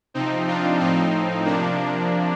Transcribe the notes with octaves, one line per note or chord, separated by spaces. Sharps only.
C3 F3 C4 D#4
D4 F4
A2 F3 C4 D#4
C3 F3 A#3 D4